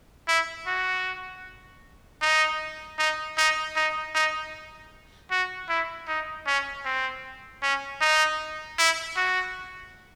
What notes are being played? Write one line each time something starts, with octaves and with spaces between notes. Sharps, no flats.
E4
F#4
D#4
D#4
D#4
D#4
D#4
F#4
E4
D#4
C#4
C4
C#4
D#4
E4
F#4